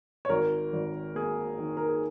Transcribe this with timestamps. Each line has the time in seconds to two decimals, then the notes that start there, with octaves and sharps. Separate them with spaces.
0.25 C#5
0.29 G#1 A#4
0.73 G#1
1.15 A#3 G#4
1.59 D#3
1.77 A#4
1.89 G#4